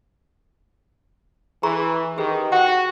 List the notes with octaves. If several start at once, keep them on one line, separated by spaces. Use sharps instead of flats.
E3 G#4 A#5 C#6
D#3 G4 G#4 B4
F#4 F#5 G5